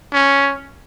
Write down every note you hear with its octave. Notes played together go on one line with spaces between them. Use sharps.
C#4